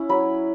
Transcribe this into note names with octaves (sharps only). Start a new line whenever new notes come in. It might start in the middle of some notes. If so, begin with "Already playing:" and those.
Already playing: C#4 E4
F#3 B5